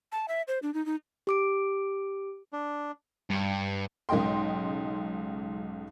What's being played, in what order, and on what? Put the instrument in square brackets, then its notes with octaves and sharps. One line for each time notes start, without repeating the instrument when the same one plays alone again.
[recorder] A5
E5
C5
D4
D#4
D#4
[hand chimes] G4 D6 D7
[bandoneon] D4
[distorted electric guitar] G2
[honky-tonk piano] B1 G#2 C#3 D#5 G5 C6